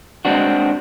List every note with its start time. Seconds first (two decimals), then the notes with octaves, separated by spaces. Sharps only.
0.25 G#3 C4 D4 F#4